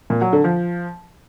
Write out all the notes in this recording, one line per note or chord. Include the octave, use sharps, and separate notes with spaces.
A#2
F#3
D3
F3